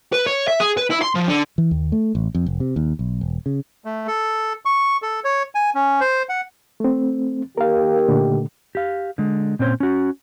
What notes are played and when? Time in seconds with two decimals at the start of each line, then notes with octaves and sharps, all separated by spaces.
0.13 B4
0.26 C#5
0.48 E5
0.60 G#4
0.77 B4
0.90 E4
1.02 C6
1.15 F3
1.28 D3
1.58 E3
1.71 D#2
1.92 A3
2.15 A1
2.35 F2
2.46 F1
2.60 C3
2.76 D#2
2.99 B1
3.21 E1
3.46 C#3
3.85 A3
4.07 A4
4.65 C#6
5.02 A4
5.24 C#5
5.55 G#5
5.75 C#4
6.00 C5
6.29 F#5
6.80 A3 C4
7.57 D#3 A#3 G4 A#4 F5
8.09 A#2 D3 A3
8.75 G4 F5
9.18 D3 G#3
9.59 A#2 C4 C#4 C5 C#5
9.80 C#4 F#4